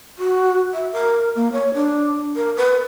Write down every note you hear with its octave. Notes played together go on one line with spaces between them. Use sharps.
F#4
E5
A#4
A#3
C#5
D4
A#4
B4